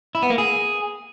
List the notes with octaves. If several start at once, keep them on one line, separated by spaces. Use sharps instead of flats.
E4
B3
A#3
G#4